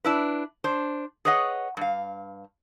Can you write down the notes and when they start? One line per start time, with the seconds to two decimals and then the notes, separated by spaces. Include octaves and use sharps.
0.04 D4 E4 B4
0.64 D4 C5
1.25 G#4 B4 C#5 D#5 F#5
1.77 G2 F5